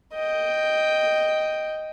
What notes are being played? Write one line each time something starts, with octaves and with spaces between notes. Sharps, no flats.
D#5 G5